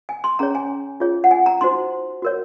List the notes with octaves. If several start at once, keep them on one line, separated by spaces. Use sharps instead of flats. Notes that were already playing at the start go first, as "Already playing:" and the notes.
G#5
C6
C#4 G#4 C#5 A#5
G#5
F4 G#4 C#5
F#5
G#5
A#5
D#4 F#4 C5 C6
F#4 A#4 C#5